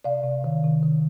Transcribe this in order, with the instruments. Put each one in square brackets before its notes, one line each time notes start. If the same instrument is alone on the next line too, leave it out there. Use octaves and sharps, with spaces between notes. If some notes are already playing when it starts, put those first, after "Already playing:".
[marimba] C3 D5 F5
C3
D#3
C3
D#3